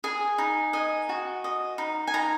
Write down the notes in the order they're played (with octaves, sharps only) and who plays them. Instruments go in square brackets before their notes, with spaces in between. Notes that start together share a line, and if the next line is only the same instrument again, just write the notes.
[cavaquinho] G#4 G#5
D#4
D#5 G#5
F#4
D#5
D#4
G#5
D#4 A#5